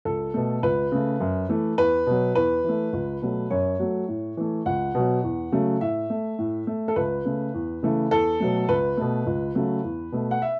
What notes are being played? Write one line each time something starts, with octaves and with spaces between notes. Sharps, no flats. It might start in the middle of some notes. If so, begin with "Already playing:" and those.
C#2 A4
B2 A3
C#2 B4
C#3 A3
F#2
E3 A3
E2 B4
B2 F#3
E2 B4
E3 A3
C#2
B2 F#3 A3
F#2 C#5
F#3 A3
A2
E3 A3
C#2 F#5
B2 F#3
E2
C#3 F#3 A3
A2 E5
A3
A2
A3
A4
C#2 B4
C#3 A3
E2
C#3 E3 A3
E2 A4
B2 F#3 A3
C#2 B4
B2 A3
C#2
C#3 F#3 A3
E2
B2 A3
F#5
E5